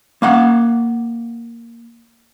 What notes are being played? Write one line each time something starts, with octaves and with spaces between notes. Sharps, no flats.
A#3 F5 F#5